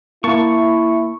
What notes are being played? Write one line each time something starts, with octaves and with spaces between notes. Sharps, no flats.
A#3 E4 A5 C#6